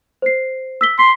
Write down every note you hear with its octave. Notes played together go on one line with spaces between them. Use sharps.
C5 C7
E6 B6 G7
C6 B6